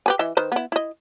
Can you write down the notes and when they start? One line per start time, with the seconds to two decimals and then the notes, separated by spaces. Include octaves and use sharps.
0.06 G4 B4 G#5
0.19 E3 D#5 E5
0.37 D#3 B4 C5
0.52 B3 E4
0.72 E4 D#5